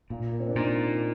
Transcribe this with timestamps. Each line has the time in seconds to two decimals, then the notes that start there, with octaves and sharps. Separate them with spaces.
0.10 A#2 F4
0.32 A#3
0.40 C4
0.47 D4
0.55 A#2 D#4